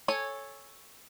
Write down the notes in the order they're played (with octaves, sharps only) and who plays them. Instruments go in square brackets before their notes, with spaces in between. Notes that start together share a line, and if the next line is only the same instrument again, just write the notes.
[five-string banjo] A4 C#5 G#5